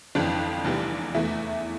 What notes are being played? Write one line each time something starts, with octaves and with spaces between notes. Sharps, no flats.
G1 F2 E3 D4
F1 E2 E3 G3
E2 E3 A3 E4